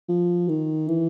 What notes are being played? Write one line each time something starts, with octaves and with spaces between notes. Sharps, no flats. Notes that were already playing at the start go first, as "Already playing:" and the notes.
F3
D#3
E3